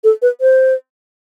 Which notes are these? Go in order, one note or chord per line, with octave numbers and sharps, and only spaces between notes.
A4
B4
C5